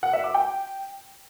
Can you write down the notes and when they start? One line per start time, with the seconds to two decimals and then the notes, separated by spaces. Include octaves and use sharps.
0.03 F#5
0.13 E5
0.24 D6
0.34 G5